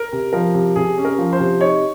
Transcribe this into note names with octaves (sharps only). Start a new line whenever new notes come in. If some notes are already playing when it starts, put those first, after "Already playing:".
Already playing: A#4
C3
F3 A#4
C3
C3 G#4
C#4
A#4
F3
C5
C3
D#4 C#5